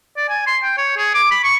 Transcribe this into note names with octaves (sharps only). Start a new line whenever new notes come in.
D5
G#5
C6
G5
C#5
G#4
D6
B5
C#6